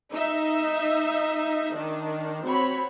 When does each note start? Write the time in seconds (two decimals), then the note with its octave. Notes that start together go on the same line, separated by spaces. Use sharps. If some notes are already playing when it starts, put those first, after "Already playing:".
0.11 D#4 E5
1.74 D#3 D4
2.45 C4 F#4 C#5 B5